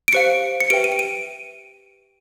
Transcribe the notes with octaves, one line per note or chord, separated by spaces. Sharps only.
D7
G4 C5 F5 C#7
C#7
G4 B4 E5 G5 D7
D#7
D7
D#7